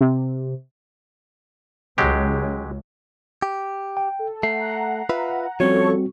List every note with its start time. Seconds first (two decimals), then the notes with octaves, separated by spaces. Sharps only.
0.01 C3
1.98 C#2 F#3 G#3 G4
3.42 G4
3.97 G5
4.19 A4
4.43 A3 F#5 A#5 C7
5.10 F4 B4 E5
5.60 F3 G3 C4 C#4 F#4 A4 C#5 C#6